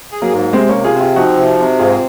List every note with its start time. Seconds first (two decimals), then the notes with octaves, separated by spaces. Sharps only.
0.11 G#4
0.22 F#3 A#3
0.32 G#2
0.53 C3 G#3 C4
0.69 A#3 C#4
0.74 C3
0.84 F4 G#4
0.95 C4
1.00 F4 G#4
1.16 F3 D#4 F#4
1.37 C3
1.58 C3
1.79 G#2 F4 G#4